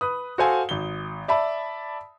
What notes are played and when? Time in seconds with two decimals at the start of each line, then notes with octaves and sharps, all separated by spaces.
0.01 B4 D#6
0.38 F#4 A4 C5 F5 G#5
0.69 G#1 G7
1.28 D5 E5 A5 B5